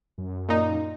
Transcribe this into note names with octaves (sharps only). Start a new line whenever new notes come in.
F#2
A#2 D#4